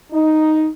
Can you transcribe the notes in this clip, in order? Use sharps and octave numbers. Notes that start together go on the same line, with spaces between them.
D#4